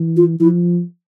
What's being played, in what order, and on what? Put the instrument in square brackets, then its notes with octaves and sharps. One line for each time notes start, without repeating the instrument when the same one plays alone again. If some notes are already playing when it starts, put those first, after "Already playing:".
Already playing: [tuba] E3
[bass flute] F4
[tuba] F3 [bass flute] E4